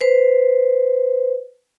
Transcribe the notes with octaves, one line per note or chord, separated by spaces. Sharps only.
B4 C5